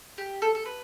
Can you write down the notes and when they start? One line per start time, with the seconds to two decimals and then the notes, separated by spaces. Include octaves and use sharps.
0.18 G4
0.42 A4
0.55 A4
0.66 B4